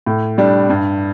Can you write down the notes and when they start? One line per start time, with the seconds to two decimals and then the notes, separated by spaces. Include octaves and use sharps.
0.06 A2
0.38 G3 D4
0.70 G2